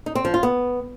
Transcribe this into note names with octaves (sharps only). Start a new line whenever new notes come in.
D#4
C4
F3
F4
B3